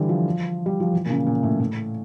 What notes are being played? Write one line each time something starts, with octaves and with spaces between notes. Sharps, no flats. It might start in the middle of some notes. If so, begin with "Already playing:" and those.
Already playing: D3 E3 G3
F3
G3
F3
E3
A#2
C#3
A#2
A2
A2